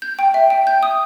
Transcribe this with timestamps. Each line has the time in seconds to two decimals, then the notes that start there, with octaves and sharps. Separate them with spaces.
0.02 G6
0.19 G5
0.34 E5
0.50 G5
0.67 G6
0.83 D#6